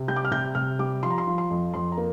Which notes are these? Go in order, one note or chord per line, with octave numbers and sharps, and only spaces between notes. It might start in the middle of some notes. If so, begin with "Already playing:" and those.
Already playing: C3
G3 G6
D6
F6
C3 G6
C3 F6
G3 D6
F3 C6
A#5
C6
F3
C6
F2
F2 C6
A#5
A#3